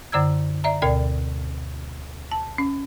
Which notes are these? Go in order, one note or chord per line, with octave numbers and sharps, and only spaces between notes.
F#2 D3 D5 A#5 E6 G#6
D5 E5 A#5
D2 B2 A#4 D5 G5
A5
C#4